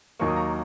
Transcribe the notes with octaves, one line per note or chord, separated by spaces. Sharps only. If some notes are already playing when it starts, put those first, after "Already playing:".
D#2 D#3 F#3 A#3 C#6
D#6
A#5 C#6